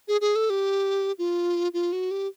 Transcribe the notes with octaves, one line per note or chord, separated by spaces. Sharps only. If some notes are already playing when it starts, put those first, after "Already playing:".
G#4
G#4
A4
G4
F4
F4
F#4
G4